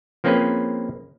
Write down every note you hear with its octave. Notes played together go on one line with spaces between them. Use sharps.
F3 A#3 C4 C#4 G#4 B4